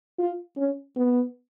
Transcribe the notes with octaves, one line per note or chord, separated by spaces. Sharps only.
F4
C#4
B3